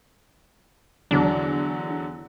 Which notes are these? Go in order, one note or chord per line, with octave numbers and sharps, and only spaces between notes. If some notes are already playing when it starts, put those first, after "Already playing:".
E2 D3 F#3 D4